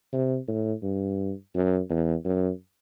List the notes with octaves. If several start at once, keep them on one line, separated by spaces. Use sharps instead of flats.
C3
A2
G2
F#2
E2
F#2